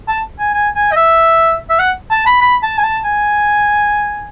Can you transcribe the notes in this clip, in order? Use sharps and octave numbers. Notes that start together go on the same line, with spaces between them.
A5
G#5
G#5
G#5
D#5
E5
E5
F#5
A5
B5
B5
A5
G#5
A5
G#5